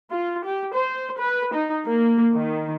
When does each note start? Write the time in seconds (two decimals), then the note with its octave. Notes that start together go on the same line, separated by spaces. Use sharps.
0.11 F4
0.44 G4
0.74 C5
1.18 B4
1.53 D#4
1.85 A#3
2.34 D#3